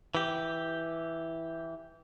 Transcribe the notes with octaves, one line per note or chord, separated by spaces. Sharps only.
E3 G4